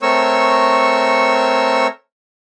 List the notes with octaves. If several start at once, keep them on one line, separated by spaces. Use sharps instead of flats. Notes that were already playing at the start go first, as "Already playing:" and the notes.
A3 C4 A#4 C#5 C#6 E6